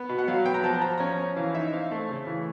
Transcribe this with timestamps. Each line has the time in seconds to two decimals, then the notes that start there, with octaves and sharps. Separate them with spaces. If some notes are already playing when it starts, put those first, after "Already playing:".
Already playing: B3
0.09 B2
0.18 F#5
0.28 F#3 F5
0.45 B3 G5
0.54 A#5
0.64 F3 A5
0.82 F3 A#5
0.98 C#4 A#5
1.18 C#4
1.36 E3 F5
1.54 D#4 E5
1.73 C4 F5
1.91 A3
2.09 C#3
2.27 E3